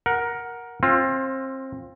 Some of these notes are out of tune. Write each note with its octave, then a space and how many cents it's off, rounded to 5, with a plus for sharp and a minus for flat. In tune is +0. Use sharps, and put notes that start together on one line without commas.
A#4 +10 F#5 +0
C4 +25 F4 +10